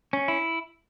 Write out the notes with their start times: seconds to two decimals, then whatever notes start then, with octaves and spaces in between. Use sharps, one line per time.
0.13 C#4
0.28 E4